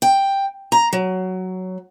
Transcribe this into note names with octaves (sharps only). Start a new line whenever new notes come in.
G5
A#5
F#3